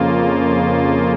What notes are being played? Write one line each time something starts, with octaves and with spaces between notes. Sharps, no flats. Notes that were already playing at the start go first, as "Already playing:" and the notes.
Already playing: F2 C#3 A#3 F4